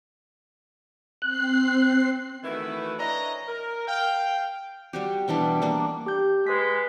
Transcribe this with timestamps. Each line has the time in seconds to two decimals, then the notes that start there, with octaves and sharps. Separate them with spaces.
1.22 C4 F#6 C7
2.43 D#3 E3 A3 E4 F#4 B4
2.99 E3 D4 C#5 D#5 A#5
3.48 A#4
3.88 F5 G5
4.93 G3 F#4 G4
5.28 B2 E3 G3 D4
5.62 A#3 D4
6.06 G4 G6
6.47 G#3 B4 B6